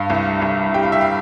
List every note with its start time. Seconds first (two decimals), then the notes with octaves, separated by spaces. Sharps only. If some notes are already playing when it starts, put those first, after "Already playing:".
Already playing: G2 F5
0.10 C2
0.42 C2
0.74 G3 G5
0.83 F5
0.92 E5
1.01 F5